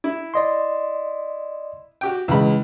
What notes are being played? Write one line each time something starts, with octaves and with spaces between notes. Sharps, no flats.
E4
D5 D#5 C6
F#4 G4 G5
C#2 E3 G#3 B5